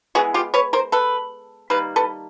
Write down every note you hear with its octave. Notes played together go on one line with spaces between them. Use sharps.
E3 G#3 B3 F#4 G#4
F4 G4
B4 C#5
A#4 C5
A4 B4
D#3 G3 A#3 B4
A4 B4